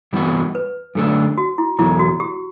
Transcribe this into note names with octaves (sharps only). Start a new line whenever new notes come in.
G2 E3 B3 F#4
B4
F#2 D3 A3 D4
F#4
E4
E2 B2 F#3 E4
F#4
G4